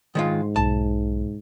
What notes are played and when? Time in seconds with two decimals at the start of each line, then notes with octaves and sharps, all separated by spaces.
0.15 G#2 D#3 G#3 F4
0.56 B1 E2 A5